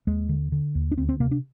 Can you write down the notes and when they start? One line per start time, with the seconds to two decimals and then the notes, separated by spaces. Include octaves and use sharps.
0.07 D#2 G#3
0.29 D3
0.52 D3
0.75 D#2
0.92 D4
0.98 D2 C4
1.09 C4
1.20 C3 A#3
1.31 D4